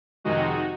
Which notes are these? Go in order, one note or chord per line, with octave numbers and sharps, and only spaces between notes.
F2 C3 D#3 G#3 D#4 F#4